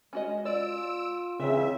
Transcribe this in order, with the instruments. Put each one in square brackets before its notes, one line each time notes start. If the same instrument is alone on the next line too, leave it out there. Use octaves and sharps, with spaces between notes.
[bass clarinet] G#3 [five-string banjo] C#4 F#4 D#5
[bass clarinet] F4 [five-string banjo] D5 [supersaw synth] E6 D7
[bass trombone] C#3 [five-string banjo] E3 [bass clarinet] C4 [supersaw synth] E5